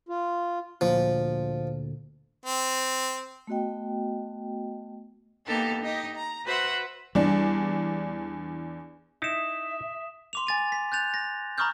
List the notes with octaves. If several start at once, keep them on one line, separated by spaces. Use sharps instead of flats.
F4
D2 A#2 F3
C4
A3 B3 F#4 D#5 G5
A#3 B3 D#4 G4 A4
D#4 G4 D#5
A#5
F#4 B4 C5 E5 F#5
E2 G3 D4
D#4 E4 E5 D#6 E7
C6 D6 F7
G#5 A6 D#7
B6
F#6 G6 A6 F7
A#6
A#5 B5 C#6 D#6 F6 G6